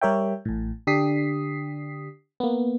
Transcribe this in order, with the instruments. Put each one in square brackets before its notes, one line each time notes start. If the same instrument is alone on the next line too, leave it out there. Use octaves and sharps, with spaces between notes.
[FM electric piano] G3 G4 A#4 C#5 E5 G5
A1 A2
D3 D4 G4 D#6 B6 C7
A#3 B3